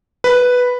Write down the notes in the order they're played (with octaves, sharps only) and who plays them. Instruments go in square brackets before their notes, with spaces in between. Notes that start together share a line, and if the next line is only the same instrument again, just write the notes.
[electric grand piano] B4